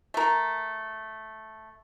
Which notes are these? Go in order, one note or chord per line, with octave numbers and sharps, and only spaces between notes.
A3 A#4